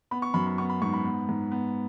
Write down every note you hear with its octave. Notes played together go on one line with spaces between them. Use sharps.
B3 B5
C#6
F#2 B5
B5
B3 C#6
B5
G#2 C#6
B5
B3
G#2
B3